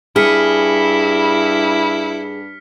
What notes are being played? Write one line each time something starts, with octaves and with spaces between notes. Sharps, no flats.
G2 E4 G#4 F6 B6 C#7